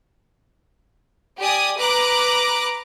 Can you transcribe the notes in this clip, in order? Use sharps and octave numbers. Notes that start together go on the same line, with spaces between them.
G4 D5 G#5 D#6
B4 A#5 D6 F#6